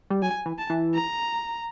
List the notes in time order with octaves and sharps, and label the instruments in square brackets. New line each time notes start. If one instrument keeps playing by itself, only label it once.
[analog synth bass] G3
[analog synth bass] F#3 [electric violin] G#5
[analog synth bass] E3
[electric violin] A5
[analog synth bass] E3
[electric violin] A#5